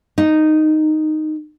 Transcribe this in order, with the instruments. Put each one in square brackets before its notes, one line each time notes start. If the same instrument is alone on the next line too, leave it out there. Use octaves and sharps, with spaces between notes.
[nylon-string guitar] D#4